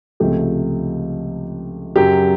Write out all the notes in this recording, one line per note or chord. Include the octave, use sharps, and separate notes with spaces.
C#2 C3 F3 A3 G4
F#2 C#3 F#3 G4